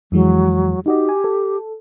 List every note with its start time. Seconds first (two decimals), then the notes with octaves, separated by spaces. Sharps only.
0.12 F2 E3 F#3 G#3
0.86 D#4 F#4 G4 D#5
1.09 G#5
1.24 A4